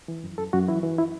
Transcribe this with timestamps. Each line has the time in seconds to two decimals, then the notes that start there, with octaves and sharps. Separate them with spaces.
0.08 E3
0.24 F#2
0.38 F#2 A4
0.53 F#2 F#4
0.68 E3 E4
0.83 E3
0.98 E4